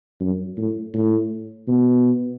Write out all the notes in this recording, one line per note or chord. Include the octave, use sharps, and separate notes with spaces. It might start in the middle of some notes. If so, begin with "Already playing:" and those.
F#2
A2
A2
B2